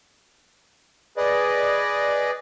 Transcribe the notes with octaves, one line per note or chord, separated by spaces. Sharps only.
G#4 B4 D5 D#5